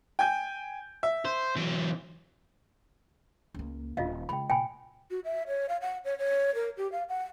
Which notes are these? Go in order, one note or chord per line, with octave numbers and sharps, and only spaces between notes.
G5 G#5 G6
E5
C5
E3 F#3
C#2 A#3
D#1 F4 D#5 F5
C#3 G#3 G5 B5
A#2 G5 G#5 B5
F#4
E5
C#5
F5
F#5
C#5
C#5
A#4
G4
F5
F#5